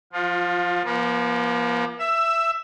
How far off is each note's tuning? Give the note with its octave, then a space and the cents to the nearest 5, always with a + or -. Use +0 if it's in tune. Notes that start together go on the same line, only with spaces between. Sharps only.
F3 +0 F4 +30
F3 -25 A#3 +40
E5 +15 E6 +0